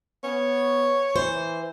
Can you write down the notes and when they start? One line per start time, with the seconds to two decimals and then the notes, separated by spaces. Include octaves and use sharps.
0.24 B3 C#5
1.16 E3 C5